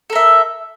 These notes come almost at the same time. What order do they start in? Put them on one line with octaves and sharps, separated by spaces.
A4 A#4 E5